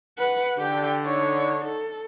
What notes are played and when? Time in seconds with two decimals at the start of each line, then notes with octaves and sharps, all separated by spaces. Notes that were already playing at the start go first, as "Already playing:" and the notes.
0.18 B4 F#5
0.58 D3 G4 G5
1.06 D#4 C#5
1.65 A4